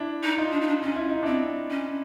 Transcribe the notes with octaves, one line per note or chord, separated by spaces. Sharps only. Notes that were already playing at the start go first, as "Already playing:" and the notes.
Already playing: D4 E4
D#4
D#4 F4
D4
D#4
D4
C#4 F4
E4
D#4
C4 D4 E4
C#4